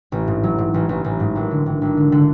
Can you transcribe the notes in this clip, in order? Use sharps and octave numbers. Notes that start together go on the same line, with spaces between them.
A1
G#2
F#3
G#2
A1
A1
A1
G#2
G#1
D3
G#1
G#1
D3
D3